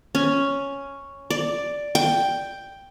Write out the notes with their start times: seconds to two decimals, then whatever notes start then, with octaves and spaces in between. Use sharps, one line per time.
0.15 C#4
1.30 D5
1.95 G5